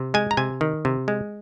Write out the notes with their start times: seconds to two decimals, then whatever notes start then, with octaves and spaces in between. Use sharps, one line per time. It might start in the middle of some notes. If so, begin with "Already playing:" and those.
Already playing: C3
0.14 G#3 G#5
0.31 A#5
0.37 C3 G#5
0.61 D#3
0.85 C3
1.08 G#3